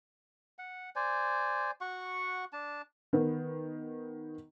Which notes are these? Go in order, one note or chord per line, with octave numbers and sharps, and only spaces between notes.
F#5
C5 D5 G#5
F#4 F#5 C#6
D4 A5
D#3 B3